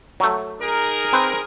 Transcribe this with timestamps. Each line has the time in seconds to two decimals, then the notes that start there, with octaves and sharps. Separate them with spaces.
0.20 F#3 A3
0.60 D#4 G#4 A#4
1.13 C4 B4 C5